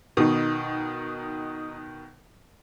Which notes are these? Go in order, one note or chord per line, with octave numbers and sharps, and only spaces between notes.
B2 D#3 D#4 D#6